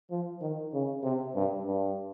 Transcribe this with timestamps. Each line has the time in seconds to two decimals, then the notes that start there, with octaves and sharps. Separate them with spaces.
0.11 F3
0.41 D#3
0.73 C#3
1.03 C3
1.35 G2
1.66 G2